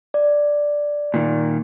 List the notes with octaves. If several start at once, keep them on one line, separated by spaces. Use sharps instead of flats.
D5
A#2 D#3